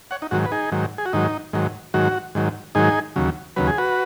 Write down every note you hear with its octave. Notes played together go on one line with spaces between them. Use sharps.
C#5 F#5
D#4
G#2 D#3 F#3 F#4
B4
D#4 G#4
G#2 D#3 F#3
G#4
F#4
G#2 D#3 F#3 D#4
G#2 D#3 F#3
G#2 D#3 F#3 F#4
G#2 D#3 F#3
G#2 D#3 F#3 D#4 G#4
D#2 C#3 F#3
D#2 C#3 F#3 B4
G#4
F#4 B4